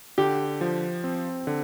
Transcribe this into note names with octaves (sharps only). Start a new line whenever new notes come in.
D3 G4
F3
C4
D3